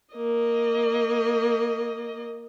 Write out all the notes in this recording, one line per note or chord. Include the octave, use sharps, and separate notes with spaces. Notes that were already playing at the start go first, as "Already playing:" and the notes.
A#3 D#5